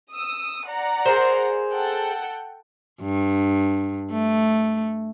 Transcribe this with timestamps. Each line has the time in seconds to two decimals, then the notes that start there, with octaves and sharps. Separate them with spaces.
0.12 D#6 E6
0.67 D5 F#5 A#5
1.06 G#4 A#4 C5
1.72 A4 F#5 G5
3.02 G2
4.11 A3